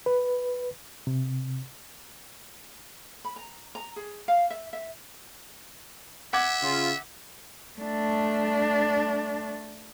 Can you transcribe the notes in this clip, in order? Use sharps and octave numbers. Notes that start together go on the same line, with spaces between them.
B4
C3
B5
A#5
A#5
G#4
F5
E5
E5
E5 F#5 D6 G#6
C#3 F4
A3 D4